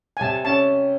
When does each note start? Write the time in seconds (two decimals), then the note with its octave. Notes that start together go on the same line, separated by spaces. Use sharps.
0.17 G#5
0.21 C3 A5
0.45 C#4 A5